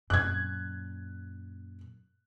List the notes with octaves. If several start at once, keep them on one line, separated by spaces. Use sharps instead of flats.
F#2 A#2 F#6 G#6